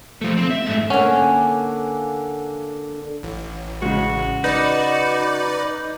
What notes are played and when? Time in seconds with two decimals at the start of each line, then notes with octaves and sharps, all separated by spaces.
0.21 F3 A3
0.37 C4
0.51 E5
0.66 G#2 A3
0.90 D3 A#3 C#4 F#5 G#5
3.23 A1
3.82 C#3 G#3 F#4
4.44 D#4 B4 D5